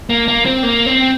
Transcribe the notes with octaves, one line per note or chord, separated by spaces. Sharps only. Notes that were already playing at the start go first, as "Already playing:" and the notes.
A#3
A#3
C4
A#3
C4